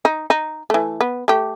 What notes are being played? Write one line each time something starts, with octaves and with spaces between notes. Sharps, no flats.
D#4
D#4
E3 A3
B3
A3 G4